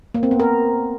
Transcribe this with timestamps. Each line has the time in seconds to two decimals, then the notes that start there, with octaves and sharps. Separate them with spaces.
0.14 A#3
0.23 C4
0.31 B3
0.40 A#4